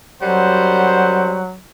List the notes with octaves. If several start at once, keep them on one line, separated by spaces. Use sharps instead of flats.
F#2 F#3 G3 C5 F#5